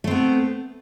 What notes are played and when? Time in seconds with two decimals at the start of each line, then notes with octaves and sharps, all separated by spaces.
0.04 A3
0.07 C4
0.11 B3